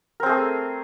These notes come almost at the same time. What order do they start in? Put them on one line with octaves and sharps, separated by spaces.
A#4 C4 G#4 A3